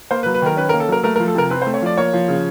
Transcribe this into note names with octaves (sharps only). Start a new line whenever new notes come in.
A#3 C5
B4
F#3
B4
D#3 A#4
C#4 B4
A#4
A#3
A4
F#3 A#4
A3 A#4
A#4
F3
A4
C3 A#4
C4 B4
C5
A3
C#5
F3 D5
A#3 C#5
F3
C#3